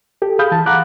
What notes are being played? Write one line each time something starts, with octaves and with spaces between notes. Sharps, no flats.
G4 A4
G#4 F5 B5 D#6 G6
E3 A5
F5 F#5 A#5 B5 D6 F#6